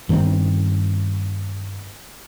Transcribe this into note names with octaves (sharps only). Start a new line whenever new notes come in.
G2 D#3 B3 C4